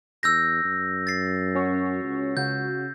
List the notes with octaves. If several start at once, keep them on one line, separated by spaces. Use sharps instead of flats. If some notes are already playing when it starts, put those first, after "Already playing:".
E2 E6 G6 A#6
F#2
A6 C7
C#4 F#4 C#5
C#2
C#3 F#4 G6